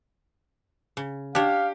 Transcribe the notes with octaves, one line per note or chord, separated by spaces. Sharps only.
C#3
D4 G4 C#5 F5